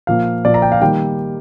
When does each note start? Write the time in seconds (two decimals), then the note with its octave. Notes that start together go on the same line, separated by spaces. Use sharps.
0.07 A#2 F3 A#3 F5
0.45 A#2 F3 A#3 D5
0.54 A#5
0.62 G5
0.72 F5
0.81 D#3 G3 A#3 G5